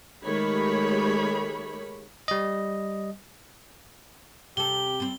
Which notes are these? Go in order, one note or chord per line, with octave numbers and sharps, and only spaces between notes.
D#3 G#3 A3 G4 C#5 B5
G3 D#5
C3 G4 A4 G7
G3 C4